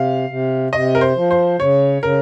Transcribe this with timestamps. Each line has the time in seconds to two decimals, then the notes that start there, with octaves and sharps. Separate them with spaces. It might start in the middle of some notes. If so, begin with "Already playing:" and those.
Already playing: C3 F5
0.29 C3
0.72 C3 D#5
0.95 A#4
1.01 C5
1.16 F3
1.31 C5
1.59 C#3 C#5
2.02 C#3 A#4